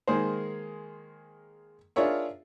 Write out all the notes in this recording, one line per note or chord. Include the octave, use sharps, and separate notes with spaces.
D#3 G#3 A#3 G#4 C5
D4 F4 G#4 A#4 C#5 E5